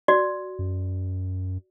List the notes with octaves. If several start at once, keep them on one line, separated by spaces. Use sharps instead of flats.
F#4 D5
F#2